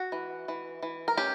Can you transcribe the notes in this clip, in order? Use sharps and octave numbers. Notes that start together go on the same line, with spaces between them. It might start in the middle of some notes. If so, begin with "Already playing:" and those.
Already playing: F#4
E3
E3
E3
A#4
C#4 G4